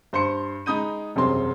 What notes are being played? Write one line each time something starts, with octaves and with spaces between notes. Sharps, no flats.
G2 C5 C6 C#7
G#3 D#4 B5 D#6 G6 D#7
E1 F#2 C3 G3 C4 C6